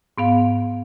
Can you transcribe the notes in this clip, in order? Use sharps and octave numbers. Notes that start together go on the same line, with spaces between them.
G#2 B3 F5